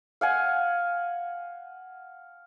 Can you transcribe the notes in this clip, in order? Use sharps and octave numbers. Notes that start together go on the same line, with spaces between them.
F5 F#5 G#5